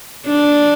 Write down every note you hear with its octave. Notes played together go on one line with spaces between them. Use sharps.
D4